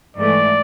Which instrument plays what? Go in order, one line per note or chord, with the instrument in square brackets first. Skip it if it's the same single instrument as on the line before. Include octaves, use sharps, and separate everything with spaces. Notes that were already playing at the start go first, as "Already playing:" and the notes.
[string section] G#2 E3 A3 [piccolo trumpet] D5